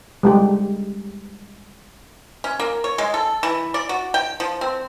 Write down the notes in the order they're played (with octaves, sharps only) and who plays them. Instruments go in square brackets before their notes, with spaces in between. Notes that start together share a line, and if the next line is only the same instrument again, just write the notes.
[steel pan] G3 G#3 G4
[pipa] C#4
A#3
C#5
G#3
A4
E3
D5
F#4
G5
F3
C4